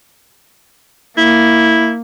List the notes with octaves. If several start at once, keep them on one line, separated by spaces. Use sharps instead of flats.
A#3 E4